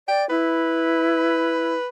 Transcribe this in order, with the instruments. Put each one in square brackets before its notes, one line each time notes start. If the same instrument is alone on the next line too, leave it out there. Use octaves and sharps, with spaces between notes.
[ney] D5 [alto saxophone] G5
[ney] E4 [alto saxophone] B4